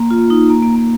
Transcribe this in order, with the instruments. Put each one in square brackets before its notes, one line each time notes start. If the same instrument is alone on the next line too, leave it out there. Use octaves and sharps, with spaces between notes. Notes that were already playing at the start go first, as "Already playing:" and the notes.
Already playing: [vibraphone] A#3
F4
D#4
A#3
A#3
A#3